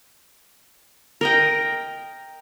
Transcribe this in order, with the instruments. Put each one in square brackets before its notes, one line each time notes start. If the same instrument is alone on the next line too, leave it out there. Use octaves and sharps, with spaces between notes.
[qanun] A#4 D#5 G5